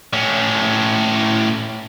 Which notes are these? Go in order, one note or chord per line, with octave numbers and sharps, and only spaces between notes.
A2 C#4